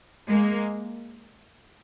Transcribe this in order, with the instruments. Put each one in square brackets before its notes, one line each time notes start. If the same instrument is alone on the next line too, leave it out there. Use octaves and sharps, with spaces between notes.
[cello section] G#3 A#3